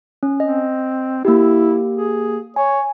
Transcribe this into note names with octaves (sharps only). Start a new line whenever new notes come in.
C#4
C4 D#5
A#3 E4 G4
G#4
C#5 G#5